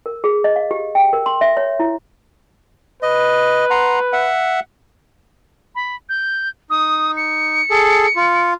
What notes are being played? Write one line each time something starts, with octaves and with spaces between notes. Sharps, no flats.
A#4
G#4
D#5
F5
G4
G5
A#4
C6
E5
C#5
E4
B4 D#5
F#5 A#5 C6
E5 F#5
B5
G6
D#4 D#6
C#7
G#4 A4
F4